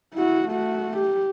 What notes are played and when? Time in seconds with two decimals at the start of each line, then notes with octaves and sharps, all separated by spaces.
0.14 E4 F#4
0.48 A3 F#4
0.97 G4